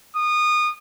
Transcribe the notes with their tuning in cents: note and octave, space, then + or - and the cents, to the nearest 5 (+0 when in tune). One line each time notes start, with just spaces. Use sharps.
D#6 -25